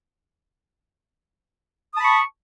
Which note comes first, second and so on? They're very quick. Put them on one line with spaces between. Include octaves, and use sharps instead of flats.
D#6 A5 B5 C#6